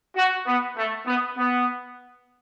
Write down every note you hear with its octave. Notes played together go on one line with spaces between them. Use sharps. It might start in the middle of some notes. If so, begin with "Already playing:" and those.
F#4
B3
A3
B3
B3